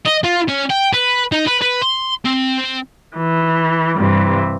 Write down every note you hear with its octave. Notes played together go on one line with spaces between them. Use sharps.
D#5
F4
C#4
G5
B4
D#4
B4
B4
C6
C4
E3
G2 C3 E3